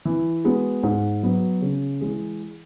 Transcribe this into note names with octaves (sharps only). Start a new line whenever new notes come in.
E3
G#3 B3 F#4
G#2
F#3 B3
C#3
E3 G#3